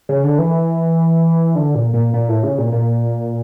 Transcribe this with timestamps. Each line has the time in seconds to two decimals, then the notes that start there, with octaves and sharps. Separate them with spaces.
0.09 C#3
0.24 D3
0.38 E3
1.55 D3
1.75 A#2
1.94 A#2
2.14 A#2
2.29 A2
2.43 C#3
2.58 A#2
2.72 A#2